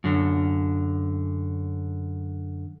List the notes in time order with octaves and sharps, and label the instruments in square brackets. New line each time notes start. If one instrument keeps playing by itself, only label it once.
[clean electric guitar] F#2 D3